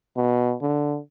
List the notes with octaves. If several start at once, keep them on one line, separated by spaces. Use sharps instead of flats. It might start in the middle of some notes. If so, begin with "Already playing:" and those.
B2
D3